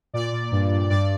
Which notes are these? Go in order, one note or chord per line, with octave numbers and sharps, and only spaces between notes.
A#2 D5
A#2
G2
G2
G2 D5